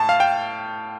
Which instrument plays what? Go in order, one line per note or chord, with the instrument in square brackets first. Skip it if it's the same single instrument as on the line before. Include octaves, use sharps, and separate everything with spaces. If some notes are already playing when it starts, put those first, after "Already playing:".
Already playing: [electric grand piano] A2 A5
F5
G5